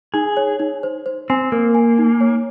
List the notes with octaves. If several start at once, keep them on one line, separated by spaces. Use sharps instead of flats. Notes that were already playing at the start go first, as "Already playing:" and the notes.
D#4 G#4
C#5
D#4
C5
C5
C4 G#5
A#3 A#4
G#5
D#4
C#5